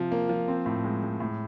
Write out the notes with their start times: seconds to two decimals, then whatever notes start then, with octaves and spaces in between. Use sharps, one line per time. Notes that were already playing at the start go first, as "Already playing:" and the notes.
Already playing: C3 F3
0.12 A#3
0.29 F3
0.48 C4
0.66 A2
0.84 G#3
1.03 G#3
1.20 A2